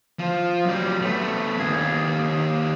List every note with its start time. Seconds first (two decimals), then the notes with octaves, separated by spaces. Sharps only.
0.19 F3
0.66 F#3 G4
1.02 A3 B3
1.59 D#2 G#4